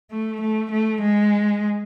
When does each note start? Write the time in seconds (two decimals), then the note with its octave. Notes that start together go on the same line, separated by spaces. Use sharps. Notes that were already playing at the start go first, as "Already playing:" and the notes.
0.11 A3
0.41 A3
0.71 A3
1.01 G#3